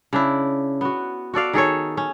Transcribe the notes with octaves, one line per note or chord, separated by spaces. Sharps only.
C#3 D4 E4
B3 F#4
F#4 A4 D5 F5
D#3 G#4 A4 C#5
C#4